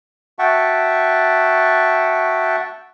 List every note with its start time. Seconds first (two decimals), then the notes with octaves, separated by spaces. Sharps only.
0.39 F#4 E5 F#5 G5 A5 C#6